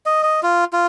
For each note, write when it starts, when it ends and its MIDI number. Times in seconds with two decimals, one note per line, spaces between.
0.06 0.22 75
0.23 0.40 75
0.43 0.65 65
0.73 0.87 65